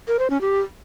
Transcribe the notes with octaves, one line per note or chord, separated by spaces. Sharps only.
A#4
C5
C#4
G4